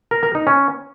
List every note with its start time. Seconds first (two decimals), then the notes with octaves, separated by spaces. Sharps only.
0.11 A#4
0.23 A#4
0.35 D#4
0.47 C#4